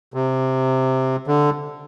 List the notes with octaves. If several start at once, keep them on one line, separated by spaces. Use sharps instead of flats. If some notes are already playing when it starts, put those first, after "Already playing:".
C3
D3